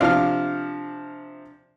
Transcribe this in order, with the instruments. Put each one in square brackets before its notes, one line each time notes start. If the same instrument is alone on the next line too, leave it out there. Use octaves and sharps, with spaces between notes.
[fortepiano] C3 F3 F6 [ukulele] D4 F5